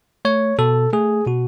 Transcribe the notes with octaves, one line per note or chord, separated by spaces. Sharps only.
A3 C#5
B2 A4
A3 G#4
B2 F#4